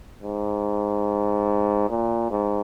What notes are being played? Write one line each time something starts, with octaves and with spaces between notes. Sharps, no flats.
G#2
A#2
G#2